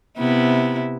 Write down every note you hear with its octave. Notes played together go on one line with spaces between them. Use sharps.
C3 B3 E4